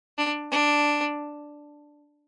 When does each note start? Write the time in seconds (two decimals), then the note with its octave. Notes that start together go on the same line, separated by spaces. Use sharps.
0.18 D4
0.52 D4